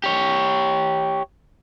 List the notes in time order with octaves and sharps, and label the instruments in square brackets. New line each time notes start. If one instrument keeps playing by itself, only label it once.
[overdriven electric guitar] G4 C#5